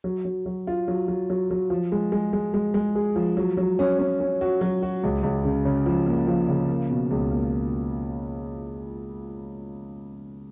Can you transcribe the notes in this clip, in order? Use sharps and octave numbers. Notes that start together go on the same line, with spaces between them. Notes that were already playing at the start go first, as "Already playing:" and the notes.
F#3
F#3
F#3
F4
F#3
F#3
F#3
F#3
F3
G#3
G#3
G#3
G#3
G#3
G#4
F3
F#3
F#3
C#4
C#4
C#4
F#4
F#3
F#4
C#2
C#2
C#3
C#3
F3
A#3
F3
C#3
A#3
B2
C#2
A#3